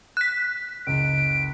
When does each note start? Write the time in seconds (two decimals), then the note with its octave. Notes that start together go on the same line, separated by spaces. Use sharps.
0.17 F#6 B6
0.87 F#1 C#2 D7